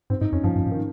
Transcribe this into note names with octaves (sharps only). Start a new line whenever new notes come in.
G#2 C4
G#2 D#4
F2 C#4
G2 F3
G2
G#2
D#3